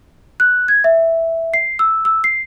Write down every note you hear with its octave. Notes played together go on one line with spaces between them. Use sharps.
F#6
G#6
E5
C7
E6
E6
C7